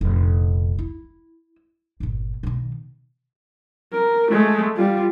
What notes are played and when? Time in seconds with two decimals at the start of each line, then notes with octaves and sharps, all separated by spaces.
0.01 F1 A#1
0.79 E4
2.00 G1 A#2
2.43 B2 D#3
3.93 A#4
4.31 G#3 A3
4.77 G3 F4